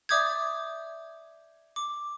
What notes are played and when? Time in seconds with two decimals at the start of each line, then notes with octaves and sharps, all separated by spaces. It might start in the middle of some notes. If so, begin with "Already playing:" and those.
0.09 D5 E5 D6 D#6 G6 G#6
1.76 D6